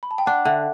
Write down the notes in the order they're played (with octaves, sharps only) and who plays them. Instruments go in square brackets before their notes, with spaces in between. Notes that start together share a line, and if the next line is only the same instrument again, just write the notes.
[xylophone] B5
A5
G5
[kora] D4 [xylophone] F#5
[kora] D3 [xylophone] E5